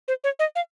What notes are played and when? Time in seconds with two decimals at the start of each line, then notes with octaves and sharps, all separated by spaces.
0.08 C5
0.24 C#5
0.39 D#5
0.56 F5